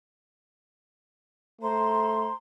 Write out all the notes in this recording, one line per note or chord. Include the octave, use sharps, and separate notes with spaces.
A3 C5 A#5 C6